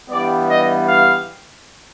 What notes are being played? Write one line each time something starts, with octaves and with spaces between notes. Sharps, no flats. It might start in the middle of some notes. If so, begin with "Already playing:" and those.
G2 E3 G3 B3 D5
D#5
F5